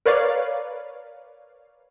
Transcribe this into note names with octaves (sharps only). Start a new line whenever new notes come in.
A#4 B4 C#5 D5 F5